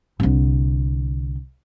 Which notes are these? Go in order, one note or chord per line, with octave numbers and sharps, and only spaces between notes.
C2 D3